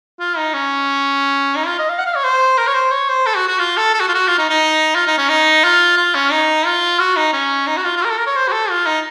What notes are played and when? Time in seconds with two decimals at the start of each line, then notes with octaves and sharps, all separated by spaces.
0.19 F4
0.37 D#4
0.53 C#4
1.55 D#4
1.66 F4
1.79 D#5
1.89 F5
1.98 F#5
2.06 F5
2.16 C#5
2.24 C5
2.57 A#4
2.67 C#5
2.74 C5
2.91 C#5
3.08 C5
3.26 A4
3.36 F#4
3.48 F#4
3.59 F4
3.77 A4
3.93 A4
4.00 F#4
4.08 F4
4.14 F#4
4.27 F4
4.38 D#4
4.49 D#4
4.95 F4
5.07 D#4
5.17 C#4
5.29 D#4
5.64 F4
5.97 F4
6.14 C#4
6.32 D#4
6.66 F4
6.99 F#4
7.16 D#4
7.33 C#4
7.66 D#4
7.77 F#4
7.83 F4
7.96 F4
8.01 F#4
8.05 A#4
8.10 A4
8.18 A#4
8.26 C#5
8.36 C5
8.48 F#4
8.52 A4
8.69 F4
8.86 D#4